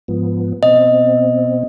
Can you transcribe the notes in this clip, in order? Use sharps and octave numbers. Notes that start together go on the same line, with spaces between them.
G#2 F3 B3
B2 C4 D#5